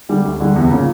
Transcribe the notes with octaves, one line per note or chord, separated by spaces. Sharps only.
D3 G3
D2
D3 G3
E2
C#3 F3 A#3